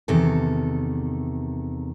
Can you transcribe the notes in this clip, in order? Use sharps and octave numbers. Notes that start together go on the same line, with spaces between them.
E2 C3 D#3 A4